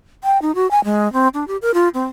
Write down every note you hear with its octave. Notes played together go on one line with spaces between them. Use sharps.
G5
D#4
F#4
G#5
G#3
C4
D4
G4
A#4
F4
C4